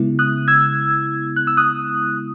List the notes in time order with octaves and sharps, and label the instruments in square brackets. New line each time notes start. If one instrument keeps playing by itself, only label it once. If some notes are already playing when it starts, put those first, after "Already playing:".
Already playing: [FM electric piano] C#3 G#3 B3 E4
D#6 F#6
E6 G#6
F#6
E6
D#6 F#6